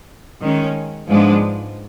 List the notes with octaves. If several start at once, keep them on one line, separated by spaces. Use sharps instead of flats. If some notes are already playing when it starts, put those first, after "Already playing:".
D#3 G#3 C#4
G#2 F3 G#3 B3 D4